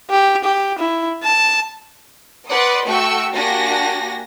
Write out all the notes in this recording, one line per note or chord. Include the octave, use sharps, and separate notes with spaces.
G4
G4
E4
A5
B4 D5 F#5 C6 D#6
A3 F#4 G5 C#6 E6
A#3 D4 F#4 G4 G#5 A#6